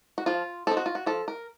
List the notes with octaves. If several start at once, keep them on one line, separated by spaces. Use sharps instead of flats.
F#4
F3 F4
C4 D#4 A4
F#4
F4
F#4
F3 A4
A#4